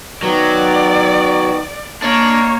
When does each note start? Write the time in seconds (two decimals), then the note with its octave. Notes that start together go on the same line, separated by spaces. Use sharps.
0.23 D#3 F#3 B3 D5
2.02 A#3 D4 C#5 D#5 F5